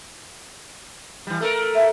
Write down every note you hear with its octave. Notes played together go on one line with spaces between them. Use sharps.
E3 G3
A3 A4 A#4
E5